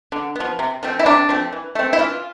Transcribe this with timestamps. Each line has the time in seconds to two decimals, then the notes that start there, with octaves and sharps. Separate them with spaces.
0.12 D3
0.35 F3 B3
0.59 C3
0.83 F3 A3 C4
0.99 E4
1.06 C3 D4
1.29 F3 A3 C4
1.53 E3
1.75 A3 C4
1.93 E4
1.99 E3 F4